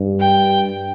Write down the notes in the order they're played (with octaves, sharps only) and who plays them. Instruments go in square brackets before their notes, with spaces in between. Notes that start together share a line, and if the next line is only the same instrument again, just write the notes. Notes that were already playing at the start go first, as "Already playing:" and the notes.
Already playing: [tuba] G2
[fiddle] G5